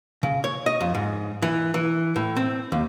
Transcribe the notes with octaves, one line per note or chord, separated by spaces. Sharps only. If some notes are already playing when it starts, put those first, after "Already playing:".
C#3
C#5
D#5
F2
G#2
E3
E3
A2
C4
D#2